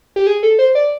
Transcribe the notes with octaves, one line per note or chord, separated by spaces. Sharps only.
G4
G#4
A4
C5
D5